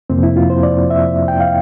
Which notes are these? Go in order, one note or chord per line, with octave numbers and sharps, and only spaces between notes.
F2 C3 F3 A#3 C4
E4
F4
C5
D5
E5
G5
F5